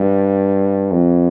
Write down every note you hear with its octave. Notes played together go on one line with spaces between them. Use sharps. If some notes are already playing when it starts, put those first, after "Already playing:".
Already playing: G2
F2